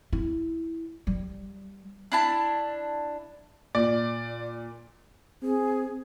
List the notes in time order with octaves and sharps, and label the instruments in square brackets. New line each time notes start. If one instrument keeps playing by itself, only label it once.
[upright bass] E4
G3
[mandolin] D4 E4 A5
[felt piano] A#2 [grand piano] D5
[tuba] C4 [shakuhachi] G#4